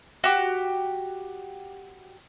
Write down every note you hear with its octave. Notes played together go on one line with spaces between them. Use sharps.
F#4 G4